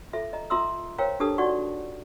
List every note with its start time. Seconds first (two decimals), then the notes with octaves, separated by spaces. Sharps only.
0.13 F4 A4 E5
0.33 D#5 A#5
0.50 F4 E5 A#5 C6 D#6 E6
0.98 A#4 C5 C#5 F5 G5 A#5
1.20 D4 G4 A4 B4 A5 D#6
1.38 D#4 F4 F#4 D5 F#5 C#6